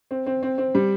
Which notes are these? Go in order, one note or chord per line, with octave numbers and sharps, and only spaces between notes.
C4
C4
C4
C4
G3